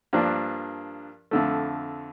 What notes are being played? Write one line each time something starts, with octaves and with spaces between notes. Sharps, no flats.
G2 F3 A#3 D4
F2 D3 A3